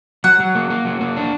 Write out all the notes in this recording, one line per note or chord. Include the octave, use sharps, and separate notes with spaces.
F#3 F#5
F#3
A#3
A#3
F#3
A#3
D4